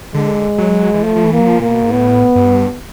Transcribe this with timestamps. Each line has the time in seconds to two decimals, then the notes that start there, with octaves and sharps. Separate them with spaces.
0.14 D3 G#3
0.58 F#3
0.94 E3
1.03 F3 A3
1.16 F3
1.25 E3
1.33 A#3
1.40 F#3
1.47 F3
1.60 A#2 A#3
1.70 B2
1.83 G#2
1.91 A2 B3
2.36 G2